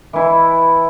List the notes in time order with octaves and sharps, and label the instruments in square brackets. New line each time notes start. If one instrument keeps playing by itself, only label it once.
[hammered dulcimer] E3 E4